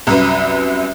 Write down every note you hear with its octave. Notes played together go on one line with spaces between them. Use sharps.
C2 F#2 B4